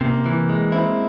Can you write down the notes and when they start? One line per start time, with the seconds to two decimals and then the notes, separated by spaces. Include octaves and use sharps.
0.01 C3 A#3
0.26 E3
0.49 G#3
0.72 C4 E4